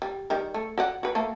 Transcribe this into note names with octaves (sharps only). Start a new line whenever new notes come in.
G3
D#3 G3 A#4
A3
F#4 D5 F#5
F#4 B4
A3 A#3 A4